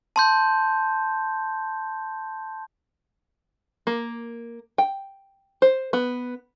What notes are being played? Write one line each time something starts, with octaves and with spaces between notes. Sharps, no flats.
A5 C6 G6
A#3
G5
C5
B3